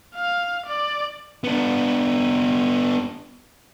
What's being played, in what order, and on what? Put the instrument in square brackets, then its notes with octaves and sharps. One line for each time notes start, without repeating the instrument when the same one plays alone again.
[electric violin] F5
D5
[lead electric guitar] B3 D4